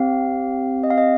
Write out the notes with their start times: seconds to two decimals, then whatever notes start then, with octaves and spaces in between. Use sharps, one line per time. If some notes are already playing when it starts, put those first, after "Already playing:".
Already playing: C4 G4 F5
0.83 D#5
0.91 F5
0.98 D#5